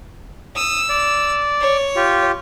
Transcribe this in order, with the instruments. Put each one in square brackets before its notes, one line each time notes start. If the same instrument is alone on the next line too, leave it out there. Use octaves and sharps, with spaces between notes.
[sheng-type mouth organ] D#6 [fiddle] E6
[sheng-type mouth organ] D5
[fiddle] C#5
[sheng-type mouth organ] F4 G4